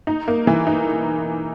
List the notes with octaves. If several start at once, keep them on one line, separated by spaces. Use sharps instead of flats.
D#4
A#3
E3
D#4